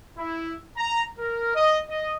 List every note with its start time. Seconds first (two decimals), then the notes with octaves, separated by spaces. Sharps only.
0.17 E4
0.77 A#5
1.18 A#4
1.55 D#5
1.89 D#5